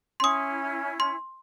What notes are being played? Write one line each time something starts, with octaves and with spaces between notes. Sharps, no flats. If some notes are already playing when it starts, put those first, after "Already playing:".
C#4 E4 C6 D#6
C6